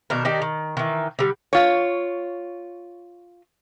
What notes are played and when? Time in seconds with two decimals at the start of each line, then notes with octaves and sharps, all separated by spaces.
0.10 B2 D#3 D4 A#4
0.25 D#3 D4 D#4 G4
0.42 D#3
0.77 D#3 E3
1.19 D3 G3
1.53 F4 C#5